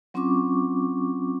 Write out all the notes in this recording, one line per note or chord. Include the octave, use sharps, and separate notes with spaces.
F#3 C4 C#4 F4 C#6 D6